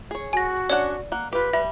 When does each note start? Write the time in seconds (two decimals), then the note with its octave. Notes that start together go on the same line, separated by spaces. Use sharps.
0.11 G#4 C#5
0.33 F#4 G#5 A#6
0.70 C#4 D4 D5 F#5
1.12 A#3 F#5
1.33 F4 G4 B4
1.53 G3 E5